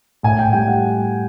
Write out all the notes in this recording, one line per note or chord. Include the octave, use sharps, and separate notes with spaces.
A2 G#5
G5
G3 G5
F#5